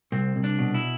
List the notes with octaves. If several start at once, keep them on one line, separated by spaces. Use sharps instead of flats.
C2 C4
C2
D4
B2
E4